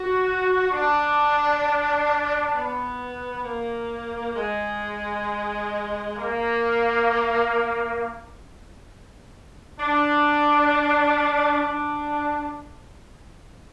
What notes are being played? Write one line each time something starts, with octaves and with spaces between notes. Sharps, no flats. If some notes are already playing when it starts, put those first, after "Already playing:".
Already playing: F#4
D4
B3
A#3
G#3
A#3
D4
D4